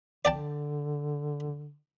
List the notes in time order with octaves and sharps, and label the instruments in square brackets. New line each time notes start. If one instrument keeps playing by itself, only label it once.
[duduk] D3 [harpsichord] D5 G5 A5